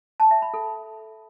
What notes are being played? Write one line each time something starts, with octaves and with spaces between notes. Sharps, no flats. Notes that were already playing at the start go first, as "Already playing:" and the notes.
A5
E5
B5
A4